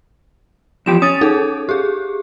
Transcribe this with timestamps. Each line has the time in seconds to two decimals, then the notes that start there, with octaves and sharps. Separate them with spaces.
0.86 E2 F3 G4 E7
1.02 C#4 D#6 A6
1.21 D#4 G#4 A4
1.69 G4 G#4